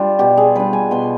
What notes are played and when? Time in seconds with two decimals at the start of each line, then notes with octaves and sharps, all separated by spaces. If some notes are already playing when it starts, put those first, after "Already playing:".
Already playing: G3 D4 F4
0.19 B2 G4
0.37 G#4
0.56 G3 D4 B4
0.73 G#5
0.91 B2 C6